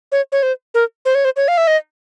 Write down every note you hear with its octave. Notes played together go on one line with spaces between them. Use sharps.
C#5
C#5
C5
A#4
C5
C#5
C5
C#5
F5
E5
D#5